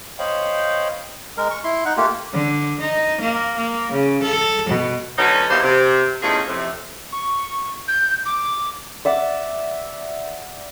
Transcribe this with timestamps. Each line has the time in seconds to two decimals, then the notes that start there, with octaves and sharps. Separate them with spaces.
0.19 C5 C#5 D#5 F5 G5 B5
1.38 G#3 A#4
1.51 C#6
1.64 E4 C6
1.85 D#4 F#5
1.97 A3 A#3 F4 G4
2.33 D3
2.80 D#4
3.20 A#3
3.57 A#3
3.91 C#3
4.22 A4
4.69 B2
5.18 D3 F#3 B3 C#4 D#4
5.50 E2 E3 A#3 D#4 G4 C5
5.63 C3
6.23 E2 A3 C#4 D#4 F4 G#4
6.48 F2 A2 C3
7.12 C#6
7.88 G6
8.26 D6
9.05 D5 E5 F#5 D6